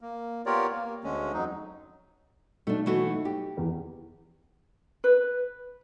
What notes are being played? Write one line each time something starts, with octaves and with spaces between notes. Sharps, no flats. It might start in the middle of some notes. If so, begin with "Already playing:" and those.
A#3
B3 F4 G4 A#4 C#5 D5
A#3
D2 D3 G#3 C#4
F2 F#3 D#4
B1 A3 D4
E3 A3 F#4
G4
E2
B4